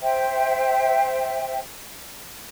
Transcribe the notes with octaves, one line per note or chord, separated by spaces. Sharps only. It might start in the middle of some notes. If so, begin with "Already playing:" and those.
C5 E5 G5